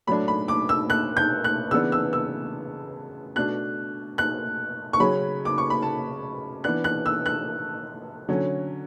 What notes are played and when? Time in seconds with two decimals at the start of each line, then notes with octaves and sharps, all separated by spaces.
0.07 A2 F#3 A3 D4 B5
0.28 B5
0.48 D6
0.69 E6
0.90 F#6
1.17 G6
1.44 F#6
1.71 C#3 E3 B3 D4 E6
1.92 E6
2.13 E6
3.36 B2 A3 D4 F#6
4.18 F#6
4.93 C#6
5.00 C#3 F#3 C#4 B5
5.45 D6
5.58 C#6
5.70 B5
5.82 A5
6.64 E3 B3 D4 F#6
6.84 F#6
7.06 E6
7.26 F#6
8.29 D3 F#3 C#4